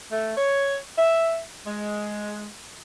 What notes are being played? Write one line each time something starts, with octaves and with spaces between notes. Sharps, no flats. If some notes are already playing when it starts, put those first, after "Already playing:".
A3
C#5
E5
G#3